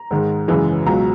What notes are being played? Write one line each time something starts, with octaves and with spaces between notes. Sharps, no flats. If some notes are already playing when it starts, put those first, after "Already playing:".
Already playing: A#5
G#2 D#3 G#3
F#2 C#3 E3 G#3
C#2 B2 F#3 A#5